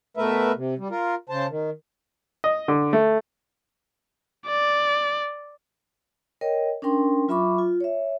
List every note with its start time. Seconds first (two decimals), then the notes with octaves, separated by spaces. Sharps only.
0.17 B2 A3 A#4 B4 E5
0.57 C3
0.78 G3
0.91 F4 A#4
1.29 C#3 C5 A5
1.50 D#3
2.44 D#5
2.68 D3
2.93 A3
4.47 D5
6.41 A#4 C#5 D#5 G5
6.82 C#4 D4 A#4 G5 C6
7.28 F#3 F4 E5 B5 C#6 D6
7.58 F4
7.80 C#5 E5